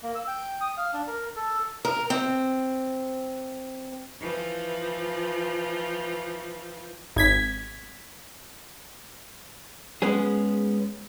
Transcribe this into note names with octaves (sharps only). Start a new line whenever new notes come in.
A#3
E6
G5
D#6
F5
D4
A#4
A4
A#4
C4
E3 F3
G#1 G#6 B6
G#3 B3 C#4 G#4